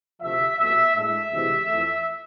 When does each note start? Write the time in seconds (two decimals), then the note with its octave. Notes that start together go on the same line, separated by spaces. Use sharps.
0.22 D2 C3 F3 A3 E5
0.58 C2 B2 A3 E5
0.95 A2 G#3 D4 E5
1.32 D2 C3 E3 G#3
1.68 F2 E3 A3